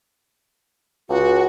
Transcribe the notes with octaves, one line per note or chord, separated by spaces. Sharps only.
C#2 F#4